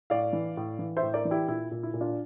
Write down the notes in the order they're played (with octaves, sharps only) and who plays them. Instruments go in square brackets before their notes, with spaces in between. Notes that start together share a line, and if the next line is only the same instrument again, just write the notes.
[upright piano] A2 D5 F5
E3
A2
E3
C5 E5
A2
A#4 D5
E3
E4 G4
A#2 E4
A#2
E4
A#2
D4 F4